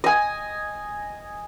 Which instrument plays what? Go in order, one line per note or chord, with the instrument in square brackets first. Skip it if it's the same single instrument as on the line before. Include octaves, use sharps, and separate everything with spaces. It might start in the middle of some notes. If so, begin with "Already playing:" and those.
[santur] D#5 G#5